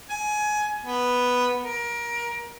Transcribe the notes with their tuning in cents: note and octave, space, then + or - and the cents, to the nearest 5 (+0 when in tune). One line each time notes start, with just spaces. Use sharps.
G#5 +20
B3 +0
A#4 +25